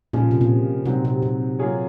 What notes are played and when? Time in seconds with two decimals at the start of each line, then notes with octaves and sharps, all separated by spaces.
0.13 A#2 C#3 F3 G#3
0.31 C3
0.41 A#2
0.86 G#2 C3 F#3 C4
1.05 C3
1.22 C3
1.59 F#3 A#3 F4 G#4 C#5